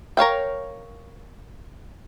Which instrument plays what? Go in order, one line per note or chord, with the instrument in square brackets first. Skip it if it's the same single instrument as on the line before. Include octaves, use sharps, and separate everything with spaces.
[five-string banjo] A#4 C#5 F5 G5